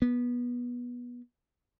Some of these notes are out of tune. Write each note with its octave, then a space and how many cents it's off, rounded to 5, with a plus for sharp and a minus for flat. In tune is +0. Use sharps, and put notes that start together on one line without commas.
B3 -20